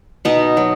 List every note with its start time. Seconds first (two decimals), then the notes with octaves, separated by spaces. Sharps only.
0.25 B2 B3 D#4
0.57 F#3